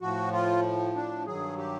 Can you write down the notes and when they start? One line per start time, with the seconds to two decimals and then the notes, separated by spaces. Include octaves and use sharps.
0.01 A2 F3 F#4
0.33 F4
0.95 D4
1.26 G2 D#3 F#3 G#4
1.58 G4